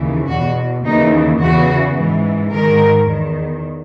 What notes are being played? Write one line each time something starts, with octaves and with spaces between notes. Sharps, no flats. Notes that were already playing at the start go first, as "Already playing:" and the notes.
Already playing: D#2 C#3 E3
E2 B2 F#4
D#2 C#3 E3 D#4
E2 C#3 E3 F#4
G#2 E3
G#2 D#3 A#4
E2 D#3